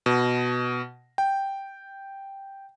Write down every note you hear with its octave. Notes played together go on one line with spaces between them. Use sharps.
B2
G5